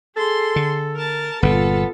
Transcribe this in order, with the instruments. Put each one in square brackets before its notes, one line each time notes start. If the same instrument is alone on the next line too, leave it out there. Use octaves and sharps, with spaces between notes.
[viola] G#4 C6 [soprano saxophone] A4
[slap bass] D3
[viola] A#4 A5
[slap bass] G1 A#2 [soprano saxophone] B3 [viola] F4 A4